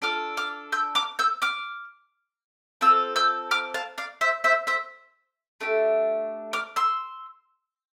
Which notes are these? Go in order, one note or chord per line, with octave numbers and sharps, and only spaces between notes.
D4 F4 A4 D6 F6
D6 F6
E6 G6
D6 F6
E6 G6
D6 F6
C4 F4 A4 E6
E6 G6
D6 F6
F5 A5
D5 F5
C5 E5
C5 E5
C5 E5
A3 D4 G4
D6 F6
C6 E6